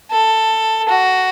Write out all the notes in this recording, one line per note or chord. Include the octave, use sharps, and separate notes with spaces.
A4
F#4